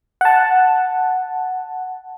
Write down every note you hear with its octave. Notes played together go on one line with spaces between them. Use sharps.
F#5 A5